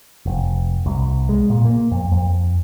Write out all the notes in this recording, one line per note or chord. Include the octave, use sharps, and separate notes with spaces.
F1
C2
G#3
A#2
A#3
F2
F2